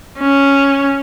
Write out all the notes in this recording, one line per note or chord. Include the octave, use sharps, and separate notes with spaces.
C#4